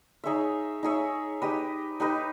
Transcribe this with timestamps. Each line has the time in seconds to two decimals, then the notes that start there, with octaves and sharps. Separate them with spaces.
0.24 D#4 G#4 C#5 E5
0.83 D#4 G#4 C#5 E5
1.42 D#4 G4 B4 D#5
2.00 D#4 G4 B4 D#5